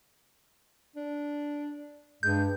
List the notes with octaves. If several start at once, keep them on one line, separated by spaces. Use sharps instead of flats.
D4
G2 G#3 G6